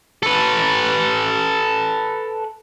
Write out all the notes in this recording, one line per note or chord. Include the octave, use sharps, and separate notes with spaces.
A4 B4